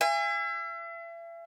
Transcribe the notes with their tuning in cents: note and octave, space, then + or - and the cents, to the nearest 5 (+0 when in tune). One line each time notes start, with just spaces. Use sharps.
E5 +40 G#5 -25